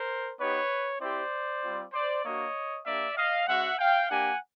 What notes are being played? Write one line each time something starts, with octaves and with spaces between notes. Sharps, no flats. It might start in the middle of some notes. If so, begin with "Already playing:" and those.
Already playing: A#4 C5
B3 D#4 G4 B4 C#5
C4 E4 G4 C5 D5
G3 C4 F4
C5 D5
A#3 D4 F#4 C#5 D#5
A#3 D4 G4 D5 E5
D#5 F5
G#3 C#4 F#4 E5 F#5
F5 G5
A#3 D4 G4 F#5 G#5